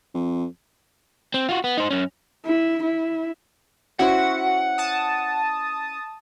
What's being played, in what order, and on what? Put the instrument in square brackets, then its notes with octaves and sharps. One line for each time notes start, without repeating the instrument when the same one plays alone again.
[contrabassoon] F2
[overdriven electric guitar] C4
F4 F#4
B3
D#4 C5
F#2 C#4
[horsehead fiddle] E4
E4
[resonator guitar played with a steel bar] C#4 E4 C5 [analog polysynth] F#4 [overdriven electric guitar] F#5
[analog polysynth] A5 D#6